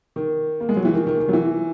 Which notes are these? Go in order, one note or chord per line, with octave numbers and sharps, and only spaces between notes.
D#3
A#3
G#3
F#3
E3
D#3
D#3
D#3
F#3
E3